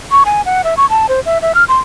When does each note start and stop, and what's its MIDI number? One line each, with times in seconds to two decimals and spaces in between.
0.11 0.23 85
0.25 0.42 80
0.46 0.62 78
0.64 0.77 76
0.77 0.88 85
0.90 1.06 81
1.09 1.20 72
1.26 1.38 76
1.42 1.55 76
1.55 1.64 89
1.68 1.79 84